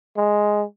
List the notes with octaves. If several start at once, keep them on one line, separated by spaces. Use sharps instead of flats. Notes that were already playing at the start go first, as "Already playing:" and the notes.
G#3